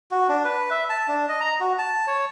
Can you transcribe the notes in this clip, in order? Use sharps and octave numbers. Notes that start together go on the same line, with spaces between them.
F#4
D4
B4
E5
A5
D4
D#5
A#5
F#4
A5
C#5